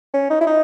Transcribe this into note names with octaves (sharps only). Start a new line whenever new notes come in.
C#4
D#4
E4
D#4